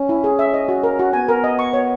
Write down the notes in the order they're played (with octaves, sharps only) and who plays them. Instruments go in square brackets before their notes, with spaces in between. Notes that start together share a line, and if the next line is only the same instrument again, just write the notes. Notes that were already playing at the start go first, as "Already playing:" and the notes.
Already playing: [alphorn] C#4
[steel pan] E4
G#4
E5
D#5
F#4
A#4
F#4
[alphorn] B3 [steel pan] G#5
[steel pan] A#4
D#5
C#6
C#5